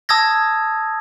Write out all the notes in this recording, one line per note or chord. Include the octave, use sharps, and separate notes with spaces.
A5 D#6 E6 G#6 A#6